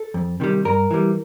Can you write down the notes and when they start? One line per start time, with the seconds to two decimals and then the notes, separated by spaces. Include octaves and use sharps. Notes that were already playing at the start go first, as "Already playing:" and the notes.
Already playing: A4
0.14 F2
0.40 C3 D#3 G3
0.65 G2 A#4
0.91 E3 G3